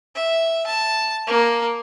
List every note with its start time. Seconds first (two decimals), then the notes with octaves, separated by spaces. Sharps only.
0.15 E5
0.67 A5
1.27 A#3